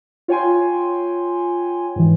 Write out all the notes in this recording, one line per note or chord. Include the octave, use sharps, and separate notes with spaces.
F4 C#5 G5 G#5 C6
G#2 E3